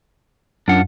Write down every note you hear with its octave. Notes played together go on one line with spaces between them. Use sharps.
F#2 D4 F4 F#5